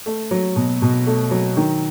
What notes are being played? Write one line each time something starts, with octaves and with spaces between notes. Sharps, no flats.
A3
F#3
B2
B2
A3
F#3
D#3